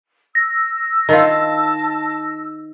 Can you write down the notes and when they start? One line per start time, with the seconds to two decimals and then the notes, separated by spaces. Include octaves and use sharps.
0.35 E6 A#6
1.09 D#3 F4 A5